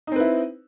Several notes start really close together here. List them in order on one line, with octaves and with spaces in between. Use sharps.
D#4 C4 B4 E4